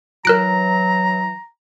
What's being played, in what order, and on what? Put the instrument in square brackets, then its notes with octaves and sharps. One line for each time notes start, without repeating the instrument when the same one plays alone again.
[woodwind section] E3 F#3 [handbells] A#4 F#6 D7 [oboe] A#5